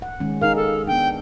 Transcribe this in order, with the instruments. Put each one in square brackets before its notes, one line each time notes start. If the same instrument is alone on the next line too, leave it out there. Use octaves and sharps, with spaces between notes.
[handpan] F#5
D#3 G#3 C#4
[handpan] D#4 G#4 A#4 [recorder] F5
[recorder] A4
[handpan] B3 D4 [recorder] G5